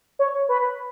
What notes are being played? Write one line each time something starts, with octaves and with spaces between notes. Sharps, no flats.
C#5
B4